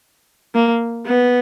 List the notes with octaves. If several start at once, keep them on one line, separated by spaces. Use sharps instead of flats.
A#3
B3